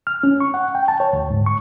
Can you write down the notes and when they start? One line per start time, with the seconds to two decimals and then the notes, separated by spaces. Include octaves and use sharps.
0.07 F6
0.23 C#4
0.40 C#6
0.54 F#5
0.75 G5
0.88 A5
1.00 C#5
1.13 D2
1.30 G#2
1.46 C#6